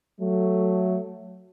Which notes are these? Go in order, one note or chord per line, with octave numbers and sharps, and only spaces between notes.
F#3 A3